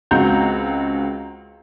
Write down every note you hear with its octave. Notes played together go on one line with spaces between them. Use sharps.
C#2 C4 F#4 A#5 G6